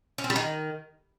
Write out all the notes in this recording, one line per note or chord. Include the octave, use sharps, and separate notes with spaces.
C#4
C4
G3
D#3